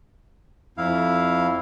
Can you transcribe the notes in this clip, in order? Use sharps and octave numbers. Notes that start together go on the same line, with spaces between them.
F2 E4 F5